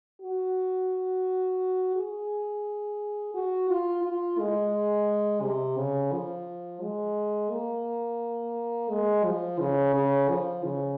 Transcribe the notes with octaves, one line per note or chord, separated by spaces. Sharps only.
F#4
G#4
F#4
F4
F4
G#3
C3
C#3
F3
G#3
A#3
G#3
F3
C#3
C#3
F3
C#3